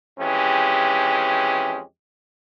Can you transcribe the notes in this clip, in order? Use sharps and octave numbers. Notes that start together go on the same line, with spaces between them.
F2 E3 G#3 C#4 G4